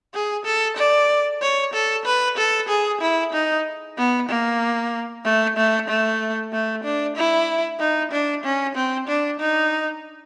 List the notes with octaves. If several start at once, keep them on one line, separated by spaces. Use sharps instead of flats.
G#4
A4
D5
C#5
A4
B4
A4
G#4
E4
D#4
B3
A#3
A3
A3
A3
A3
D4
E4
D#4
D4
C#4
C4
D4
D#4